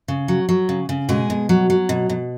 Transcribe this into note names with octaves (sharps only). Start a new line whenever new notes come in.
C#3
F#3
F#3
C#3
C#3
B2 G#3 G#4
B2
F#3
F#3
B2
B2